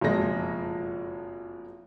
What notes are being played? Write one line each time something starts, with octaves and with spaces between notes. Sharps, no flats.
F#1 F2 B2 F3 G#3 A#6